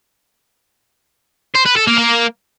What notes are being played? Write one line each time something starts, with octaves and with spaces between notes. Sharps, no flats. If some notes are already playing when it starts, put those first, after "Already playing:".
C5
B4
A4
A#3
A#3